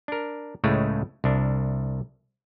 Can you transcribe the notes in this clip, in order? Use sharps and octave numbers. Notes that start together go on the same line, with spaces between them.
D4 A#4
C#2 A2 C#3 G#3 A3
C2 D4